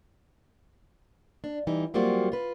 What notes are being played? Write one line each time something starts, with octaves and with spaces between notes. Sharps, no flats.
D4
E3 G3 D#4
F#3 G3 A#3 C4 F4 F#4
F4 B4